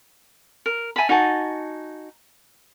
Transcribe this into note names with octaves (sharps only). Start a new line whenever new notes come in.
A#4
E5 G#5 A5 B5
D#4 F#4 G#5 A5